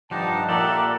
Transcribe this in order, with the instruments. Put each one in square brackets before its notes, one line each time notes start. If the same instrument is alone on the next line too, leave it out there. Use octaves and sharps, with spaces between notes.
[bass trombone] G2 [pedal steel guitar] F3 D#4 [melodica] G4 D#5 F#5 [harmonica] A5
[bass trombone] A#2 [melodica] G4 E5 [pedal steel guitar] A4 D5 [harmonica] A#4 F#5